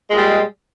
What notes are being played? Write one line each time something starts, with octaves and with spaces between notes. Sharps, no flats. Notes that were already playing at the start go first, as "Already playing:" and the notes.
A#2 G3 G#3